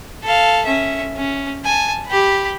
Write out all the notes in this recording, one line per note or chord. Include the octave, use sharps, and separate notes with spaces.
A4 F5
C#4 E5
C#4
G#5 A5
G4 B5